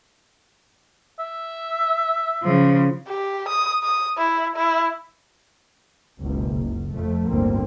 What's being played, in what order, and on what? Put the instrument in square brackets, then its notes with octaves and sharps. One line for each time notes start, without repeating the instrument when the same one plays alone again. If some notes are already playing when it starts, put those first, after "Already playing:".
[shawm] E5
[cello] C#3 F3
[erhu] G4
D#6
D#6
E4
E4
[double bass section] F#1 C#2 B2
C#2 F#2
F2 F3 A3
G1 D2 A2 D3 A#3 C4